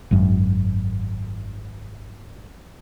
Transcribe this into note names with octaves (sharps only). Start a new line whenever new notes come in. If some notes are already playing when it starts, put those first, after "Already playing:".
G#1 F#2